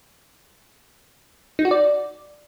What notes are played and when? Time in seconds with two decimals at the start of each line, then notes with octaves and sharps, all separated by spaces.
1.59 D#4
1.65 F#4
1.71 D5